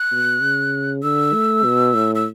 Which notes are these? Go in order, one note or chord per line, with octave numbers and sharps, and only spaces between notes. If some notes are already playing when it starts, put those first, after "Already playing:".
Already playing: F#6
B2
C#3
D3 E6
A3
B2
A2
E6